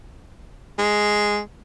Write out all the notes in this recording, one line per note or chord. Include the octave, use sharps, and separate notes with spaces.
G#3